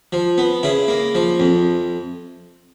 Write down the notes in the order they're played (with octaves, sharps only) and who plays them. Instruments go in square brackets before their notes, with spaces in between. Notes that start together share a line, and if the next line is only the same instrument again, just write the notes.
[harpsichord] F3
B3
C#3 E4
A#3
F3
F2